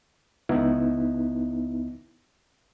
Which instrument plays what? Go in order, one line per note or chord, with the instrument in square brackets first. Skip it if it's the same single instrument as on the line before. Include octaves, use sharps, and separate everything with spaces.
[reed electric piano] C#2 B3 D#4 E4